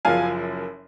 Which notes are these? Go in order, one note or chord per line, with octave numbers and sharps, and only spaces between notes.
F#1 F#2 F3 F5 G#5